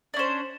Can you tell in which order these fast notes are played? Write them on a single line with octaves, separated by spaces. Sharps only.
D4 C#4 C5